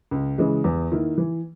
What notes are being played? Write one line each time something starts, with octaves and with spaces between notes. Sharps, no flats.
C#2
C#3 E3 G#3
E2
D#3 A#3 E4
E3